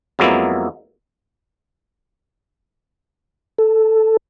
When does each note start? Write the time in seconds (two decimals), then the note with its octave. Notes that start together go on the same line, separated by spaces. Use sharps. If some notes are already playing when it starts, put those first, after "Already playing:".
0.19 F2 F#3 G#3 A#3 B3 E4
3.59 A4